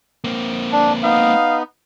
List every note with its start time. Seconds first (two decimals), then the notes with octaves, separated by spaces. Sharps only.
0.24 A#3 C4
0.72 D4
1.03 B3 D#4 F5